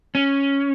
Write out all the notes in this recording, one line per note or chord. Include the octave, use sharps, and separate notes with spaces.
C#4